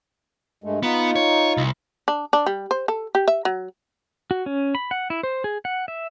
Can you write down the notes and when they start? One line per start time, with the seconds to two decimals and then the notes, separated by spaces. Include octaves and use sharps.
0.64 G2 G#3 A3
0.83 B3 D#4 F4
1.16 C#5
1.57 C2
2.08 D4
2.33 D4
2.46 G3
2.71 C5
2.88 A4
3.15 G4
3.28 E5
3.45 F#3
4.31 F#4
4.46 C#4
4.75 B5
4.91 F#5
5.10 E4
5.23 C5
5.44 G#4
5.65 F#5
5.88 E5